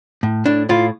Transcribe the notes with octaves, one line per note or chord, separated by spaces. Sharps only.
A2
A2 D4
A2 F4